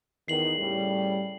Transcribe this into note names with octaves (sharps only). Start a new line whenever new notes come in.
E2 D#3 C7 F#7
A2 C#3 G3